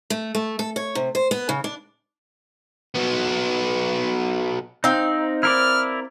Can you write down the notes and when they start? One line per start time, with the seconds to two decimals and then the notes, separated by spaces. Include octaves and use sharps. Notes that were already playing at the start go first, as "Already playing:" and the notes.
0.10 A3
0.35 A3
0.59 A4
0.76 C#5
0.95 C3
1.15 C5
1.31 B3
1.49 C#3
1.64 D4
2.94 F#3 B3
4.84 C4 D#4 F5
5.43 E4 A#4 D5 F6